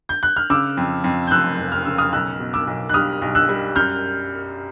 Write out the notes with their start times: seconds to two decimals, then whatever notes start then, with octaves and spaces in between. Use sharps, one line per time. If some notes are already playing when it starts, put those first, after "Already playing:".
0.09 G6
0.23 F#6
0.37 F6
0.50 C#3 D6 E6
0.77 F2
1.04 F2
1.27 G6
1.31 F1 E6 F#6
1.58 F1
1.72 F6
1.85 C#3 E6
1.98 D#6 F6
2.13 B1 E6 F#6
2.40 B2
2.53 D6 E6
2.67 B1
2.89 F#6
2.94 G3 D#6 F6
3.22 B1
3.35 E6 F#6
3.49 G3
3.76 F#2 F6 G6